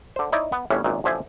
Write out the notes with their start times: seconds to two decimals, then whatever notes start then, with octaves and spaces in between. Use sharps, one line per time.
0.16 D3 C5
0.32 D#4 E4 C#5 D5
0.52 B3
0.70 G1 A2 E3 C#4 G#4
0.84 G#1 F#2 A#2
1.04 A1 D3 F3 C5 E5 G#5